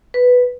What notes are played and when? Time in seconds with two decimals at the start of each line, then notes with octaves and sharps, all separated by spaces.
0.14 B4